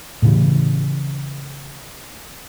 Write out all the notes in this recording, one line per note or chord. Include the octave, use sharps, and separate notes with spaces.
A2 C#3 E3